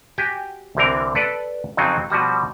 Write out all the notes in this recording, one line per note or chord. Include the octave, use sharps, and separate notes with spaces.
F#4 G4 G5 G#5
C2 D3 E3 C4 A#4
A4 B4 D5 A5
F2 C#3 F#3 C4 D#4
B2 F3 G3 F#4